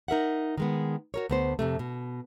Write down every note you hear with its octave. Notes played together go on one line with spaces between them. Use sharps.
D#4 A#4 E5 F#5
D#3 G#3 B3
F#4 A#4 C#5
D2 B3 C5
F2 C3 A3
B2